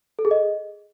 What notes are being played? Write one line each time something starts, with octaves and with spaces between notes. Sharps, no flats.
A4
G#4
D#5